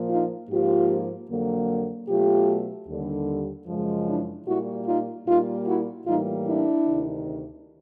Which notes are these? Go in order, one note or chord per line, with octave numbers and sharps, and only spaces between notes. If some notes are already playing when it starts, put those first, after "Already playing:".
Already playing: A#2 F3 A#3
D#4 F4
G#2 F3 A#3 F4 G4
F2 D3 F#3 A#3
B2 F#3 A3 F4 G4
D#2 D3 G3
F#2 C#3 F3 G#3
D4 E4
A#2 G3 A#3 E4 F#4
D#4 F4
A#2 G3 A#3 D#4 F4
E4 F#4
A2 E3 G3 A#3 D#4 F4
D4 E4
D2 C3 D#3